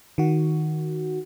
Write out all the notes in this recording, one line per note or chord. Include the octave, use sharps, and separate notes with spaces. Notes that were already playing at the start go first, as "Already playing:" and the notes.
D#3 F#4